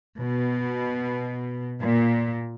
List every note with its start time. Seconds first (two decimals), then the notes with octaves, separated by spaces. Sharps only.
0.20 B2
1.83 A#2